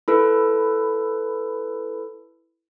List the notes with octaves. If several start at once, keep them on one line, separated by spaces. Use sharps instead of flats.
E4 A4 B4